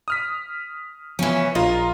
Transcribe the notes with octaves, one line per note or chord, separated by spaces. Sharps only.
D#6 F6 B6
E3 F3 B3 C#4
A#1 F4 A#4 D#5